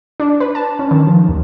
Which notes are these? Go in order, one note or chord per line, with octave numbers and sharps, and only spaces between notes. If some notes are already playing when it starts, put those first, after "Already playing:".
D4
B4
A5
C#4
D#3
F3
D#2